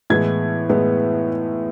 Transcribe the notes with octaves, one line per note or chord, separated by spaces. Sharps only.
A2 E3 G#3 B3 G#6
A2 E3 G#3 B3